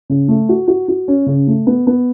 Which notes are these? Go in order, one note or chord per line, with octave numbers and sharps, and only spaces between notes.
C#3
A3
F#4
F#4
F#4
C#4
C#3
A3
B3
B3